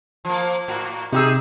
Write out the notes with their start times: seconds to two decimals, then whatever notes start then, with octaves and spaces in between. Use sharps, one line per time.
0.25 F3 A#3
0.68 A2 A#3 F#4
1.13 C3 D#4 E4 G4 G#4 E6